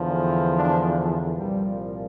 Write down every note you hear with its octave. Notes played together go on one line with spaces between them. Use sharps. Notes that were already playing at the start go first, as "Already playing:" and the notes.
Already playing: E2 D3 F3
D4
C2 A#2 F3 G3